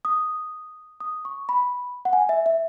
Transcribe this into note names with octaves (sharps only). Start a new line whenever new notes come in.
D#6
D#6
C#6
B5
F#5
G#5
E5
E5